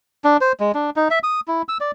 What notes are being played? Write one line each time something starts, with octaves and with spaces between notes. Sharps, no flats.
D4
C5
G#3
D4
D#4
E5
D#6
E4
E6
D5